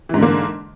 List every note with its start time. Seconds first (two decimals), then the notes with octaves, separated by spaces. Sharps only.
0.09 E3
0.14 G#2
0.18 D3
0.23 A#3